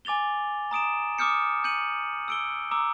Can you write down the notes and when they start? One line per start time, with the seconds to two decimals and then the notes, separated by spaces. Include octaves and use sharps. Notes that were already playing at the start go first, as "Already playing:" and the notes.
0.05 G#5 D6 A6 F7 G7
0.71 A#5 D#6 D7 E7
1.18 D6 D#6 F6 G6 C#7
1.64 G6 C#7 D#7 F#7
2.28 E6 D7 G7
2.71 A#5 D6 E6